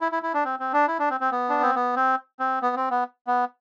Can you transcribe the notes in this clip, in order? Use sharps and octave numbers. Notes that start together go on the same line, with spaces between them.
E4
E4
E4
D4
C4
C4
D4
E4
D4
C4
C4
B3
D4
C4
B3
C4
C4
B3
C4
B3
B3